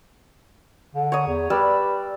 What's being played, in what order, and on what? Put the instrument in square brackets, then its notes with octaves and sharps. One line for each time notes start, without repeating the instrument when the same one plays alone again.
[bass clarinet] D3
[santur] C#5 A#5 D#6
[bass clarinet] E2
[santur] G3 D5 E6 [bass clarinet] B4